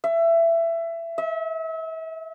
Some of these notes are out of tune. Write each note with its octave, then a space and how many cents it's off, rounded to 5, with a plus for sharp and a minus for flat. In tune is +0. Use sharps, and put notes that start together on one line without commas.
E5 +20
E5 -35